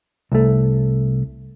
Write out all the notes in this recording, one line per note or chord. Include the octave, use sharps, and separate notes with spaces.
C2 A3